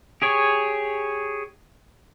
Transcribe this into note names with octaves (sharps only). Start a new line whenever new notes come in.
G4 G#4 C#5